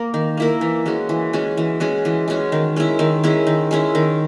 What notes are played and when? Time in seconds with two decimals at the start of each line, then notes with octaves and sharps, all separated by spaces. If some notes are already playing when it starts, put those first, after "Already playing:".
Already playing: A#3 A#4
0.14 D#3
0.37 A#3 E4 A#4
0.61 E3
0.86 G#3 C#4 F#4
1.09 E3
1.33 G#3 C#4 F#4
1.57 E3
1.80 G#3 C#4 F#4
2.05 E3
2.28 G#3 C#4 F#4
2.52 D#3
2.76 G#3 C#4 E4
2.99 D#3
3.24 G#3 C#4 E4
3.47 D#3
3.71 G#3 C#4 E4
3.95 D#3